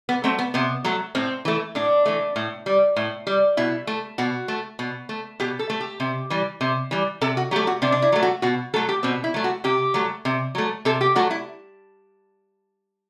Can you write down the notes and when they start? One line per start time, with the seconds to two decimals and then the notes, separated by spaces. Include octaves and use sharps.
0.09 B3
0.24 F#3 A3 C4
0.39 B3
0.54 C3 B3
0.84 F#3 A3
1.15 A2 C4
1.45 E3 A3
1.75 A2 D4
2.06 E3 A3
2.36 A2
2.66 G3
2.96 A2
3.27 G3
3.57 B2 E4
3.87 A3
4.18 B2 F#4
4.48 A3
4.79 B2
5.09 A3
5.40 B2 G4
5.59 A4
5.70 A3
5.81 G4
6.00 C3
6.30 E3 G3
6.61 C3
6.91 E3 G3
7.21 C3 A4
7.37 F#4
7.51 F#3 G4
7.56 A3
7.67 F#4
7.82 C3 D4
7.92 D4
8.02 E4
8.12 F#3 A3
8.23 F#4
8.42 B2 F#4
8.74 F#3 A3 A4
8.89 G4
9.03 B2 C4
9.24 E4
9.34 F#3 A3
9.44 F#4
9.64 C3 G4
9.94 F#3 A3
10.25 C3
10.55 F#3 A3
10.85 C3 A4
11.01 G4
11.16 F#3 A3 F#4
11.31 E4